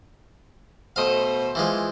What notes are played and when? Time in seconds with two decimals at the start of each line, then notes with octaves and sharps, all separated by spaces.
0.96 B2 A3 C5 D#5 F5
1.55 E3 F3 G#3